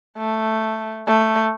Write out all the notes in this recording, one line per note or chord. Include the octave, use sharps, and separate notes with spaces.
A3
A3